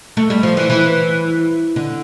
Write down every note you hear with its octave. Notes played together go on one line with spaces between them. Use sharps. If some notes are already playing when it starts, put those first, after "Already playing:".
A3
G3
F3
E3
E3
D3